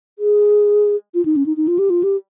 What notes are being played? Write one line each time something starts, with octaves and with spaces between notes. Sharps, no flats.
G#4
F4
D#4
C#4
D#4
D#4
F4
G4
F4
G4